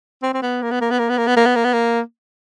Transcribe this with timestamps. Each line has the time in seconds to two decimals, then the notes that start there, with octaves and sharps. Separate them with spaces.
0.23 C4
0.34 C4
0.42 B3
0.62 A#3
0.71 B3
0.81 A#3
0.91 B3
0.99 A#3
1.09 B3
1.17 A#3
1.27 B3
1.37 A#3
1.46 B3
1.55 A#3
1.64 B3
1.73 A#3